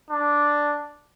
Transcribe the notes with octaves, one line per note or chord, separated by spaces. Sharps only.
D4